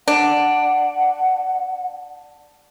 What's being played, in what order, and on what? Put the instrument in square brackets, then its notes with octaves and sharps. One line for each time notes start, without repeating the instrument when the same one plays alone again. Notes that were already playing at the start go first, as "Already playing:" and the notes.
[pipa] D4 [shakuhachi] F#5